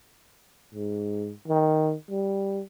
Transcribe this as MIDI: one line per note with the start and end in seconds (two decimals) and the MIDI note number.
0.75 1.32 44
1.48 1.94 51
2.10 2.61 55